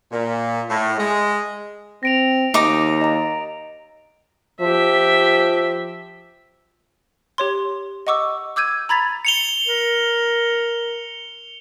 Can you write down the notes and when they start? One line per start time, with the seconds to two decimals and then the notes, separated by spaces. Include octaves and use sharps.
0.11 A#2
0.69 A2
0.98 G#3
2.03 C4 A#6 D7 F7
2.54 D#2 D#4 D6
3.01 D#5 A#5
4.61 F3 G4 E5
7.38 G4 C#5 C6
8.07 D#5 F#5 C#6 D6 E6
8.56 D6 E6 G6 G#6 D#7
8.89 A#5 B5 G#6 A6 B6 F7
9.25 C#7 F7 G7
9.67 A#4